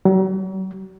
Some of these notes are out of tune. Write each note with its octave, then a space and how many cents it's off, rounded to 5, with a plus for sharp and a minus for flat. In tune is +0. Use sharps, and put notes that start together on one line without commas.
F#3 +45